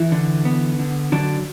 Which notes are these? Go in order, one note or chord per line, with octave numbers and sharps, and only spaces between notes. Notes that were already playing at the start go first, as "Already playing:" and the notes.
Already playing: E3 E4
D3
B3
D3
D3 F#3 D4